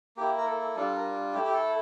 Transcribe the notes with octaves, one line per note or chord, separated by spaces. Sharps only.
A#3 E4 G4
A#4
A4
A4
G3 D4 F4 A4
A#4
A3 E4 G4
G4
A4